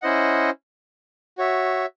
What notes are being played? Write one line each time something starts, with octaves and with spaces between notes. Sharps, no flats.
C#4 E4 C5 D#5 F#5
F#4 C#5 E5